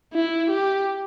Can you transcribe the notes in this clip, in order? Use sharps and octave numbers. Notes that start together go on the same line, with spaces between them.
E4
G4